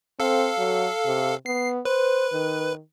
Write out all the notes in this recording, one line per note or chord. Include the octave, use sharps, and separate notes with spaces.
C4 A4 F5
F#3
C3
B3 C7
B4 C5
D#3